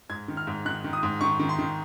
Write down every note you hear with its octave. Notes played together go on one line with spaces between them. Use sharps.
G#2 G#6
D#3
F6
G#2
D#3 F#6
D#3
D#6
G#2
D#3 C#6
D#3
C6
D#3